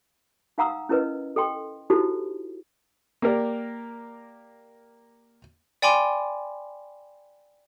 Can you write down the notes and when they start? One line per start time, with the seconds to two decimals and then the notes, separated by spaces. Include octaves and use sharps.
0.58 D#4 F5 F#5 A#5 D#6 E6
0.89 C#4 E4 A#4 B4 D#5
1.36 A4 D#5 G5 C6
1.90 D#4 E4 F#4 G4 A4 C5
3.22 A#3 G4 A#4 D5
5.82 D5 G5 G#5 B5 C6 D6